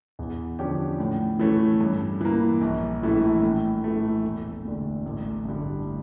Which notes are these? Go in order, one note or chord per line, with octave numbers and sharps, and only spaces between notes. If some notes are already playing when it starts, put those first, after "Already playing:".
E2
D3 F3 C#4 G4
A2
E3 A3 C#4
G2
E3 A#3
A#1
A2 E3 A3 E4
A2
E3 A3
E1
D2 D3
A1
G2 D3 G3